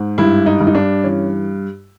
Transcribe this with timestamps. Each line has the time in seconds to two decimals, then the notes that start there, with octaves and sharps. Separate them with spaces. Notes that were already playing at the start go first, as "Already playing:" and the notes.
Already playing: G#2
0.18 G2 E4
0.46 D#4
0.61 G2
0.67 D#4
0.75 D4
1.04 E3 C#4